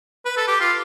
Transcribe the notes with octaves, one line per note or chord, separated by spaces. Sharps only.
B4
A4
G4
F4